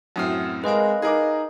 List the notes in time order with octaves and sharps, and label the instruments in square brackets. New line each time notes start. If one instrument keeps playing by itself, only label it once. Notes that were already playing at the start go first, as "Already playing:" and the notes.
[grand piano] F#2 A2 C4 [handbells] F#5 D#6 F6
[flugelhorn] G#3 [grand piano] C4 A#4 [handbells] B4 D#5 F5
[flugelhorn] D#4 [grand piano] G#4 A#4 D6